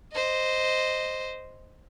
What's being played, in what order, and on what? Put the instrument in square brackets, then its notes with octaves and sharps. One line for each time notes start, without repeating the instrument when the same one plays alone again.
[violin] C5 D#5